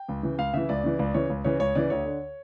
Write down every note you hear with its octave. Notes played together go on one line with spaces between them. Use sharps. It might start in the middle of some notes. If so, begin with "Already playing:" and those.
Already playing: G5
C#2
C#3 E3
C#2 F5
C#3 E3 E5
C#2 D5
C#3 E3
C#2 D5
C#3 E3 C#5
C#2
C#3 E3 C#5
C#2 C#5
C#3 E3 D5
D2 C#5
D3